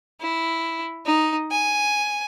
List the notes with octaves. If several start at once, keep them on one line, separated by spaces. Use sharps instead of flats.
E4
D#4
G#5